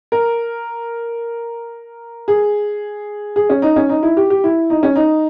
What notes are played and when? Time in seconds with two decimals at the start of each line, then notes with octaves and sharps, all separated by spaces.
0.12 A#4
2.28 G#4
3.36 G#4
3.50 C#4
3.62 D#4
3.76 C#4
3.89 D#4
4.03 E4
4.17 G4
4.30 G4
4.44 E4
4.70 D#4
4.83 C#4
4.96 D#4